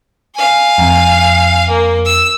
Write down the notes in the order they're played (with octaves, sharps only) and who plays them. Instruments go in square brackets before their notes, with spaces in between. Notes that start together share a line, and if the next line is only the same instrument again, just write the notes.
[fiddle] F5 G#5
[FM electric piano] F2
[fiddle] A#3
E6